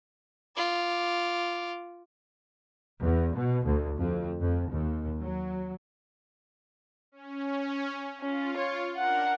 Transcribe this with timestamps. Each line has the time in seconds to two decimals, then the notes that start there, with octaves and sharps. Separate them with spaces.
0.56 F4 D6
3.02 E2
3.34 B2
3.65 D2
3.99 F2
4.42 F2
4.71 D#2
5.21 F#3
7.12 C#4
8.21 C#4 F4
8.57 C#5
8.96 D4 A#4 F#5